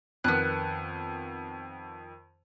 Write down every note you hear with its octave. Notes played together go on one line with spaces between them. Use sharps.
F2 D#3 B3 F#6